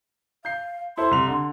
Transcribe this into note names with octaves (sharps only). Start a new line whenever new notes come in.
F5 G6 C7
E4 A4 C5 C6
C2 F7
D3